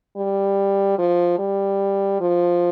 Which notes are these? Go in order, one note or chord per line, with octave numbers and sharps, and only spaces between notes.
G3
F3
G3
F3